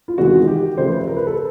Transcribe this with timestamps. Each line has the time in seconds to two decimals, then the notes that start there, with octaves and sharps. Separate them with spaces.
0.08 F4
0.18 E2 C3 D#3 G#3 F#4
0.47 G4
0.78 C#3 F3 A3 C5
0.92 B4
1.07 A#4
1.17 B4
1.27 A4